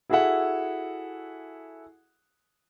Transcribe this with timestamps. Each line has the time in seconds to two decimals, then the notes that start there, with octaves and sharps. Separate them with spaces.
0.09 E4 F#4 G#4 A4 E5 F#5